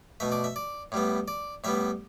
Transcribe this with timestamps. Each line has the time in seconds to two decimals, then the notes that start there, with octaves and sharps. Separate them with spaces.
0.20 B2 A3 E5
0.32 D5
0.44 E5
0.56 D5
0.92 A2 G3 B3
1.28 D5
1.64 A2 G3 B3 E5